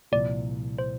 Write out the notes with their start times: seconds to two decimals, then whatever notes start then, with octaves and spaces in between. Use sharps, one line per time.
0.12 C2 A#2 F3 D5
0.79 C5